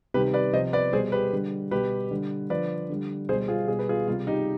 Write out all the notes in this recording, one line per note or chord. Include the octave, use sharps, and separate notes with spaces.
C3 D#3 G3 G4 B4
B4 D5
C3 F3 C5 D#5
B4 D5
B2 G3 G#4 C5
G4 B4
D3 G3
B2 G3 G4 B4
D3 G3
D3 F3 B4 D5
D3 G3
B2 G3 G#4 C5
F4 G#4
B2 G3 G#4
B4
F4 G#4
C3 G3 F4
D#4 G4